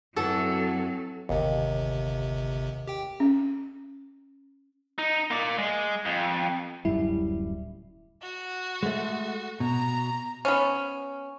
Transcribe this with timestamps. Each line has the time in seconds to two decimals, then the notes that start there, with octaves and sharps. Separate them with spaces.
0.16 F#2 E3 F#3 C4 F#4 A4
1.29 G1 D#2 C3
2.87 G4 G5
3.20 C#4
4.98 D#4
5.31 A#3 D5
5.58 G#3
6.06 F2
6.85 D1 F#2 G3 E4
8.22 F#4
8.83 G#3 A3
9.60 B2 A#5
10.45 B3 C#4